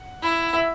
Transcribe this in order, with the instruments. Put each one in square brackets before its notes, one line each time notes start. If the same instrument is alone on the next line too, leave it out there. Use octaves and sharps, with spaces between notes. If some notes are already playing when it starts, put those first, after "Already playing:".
Already playing: [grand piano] F#5
[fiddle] E4
[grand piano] E5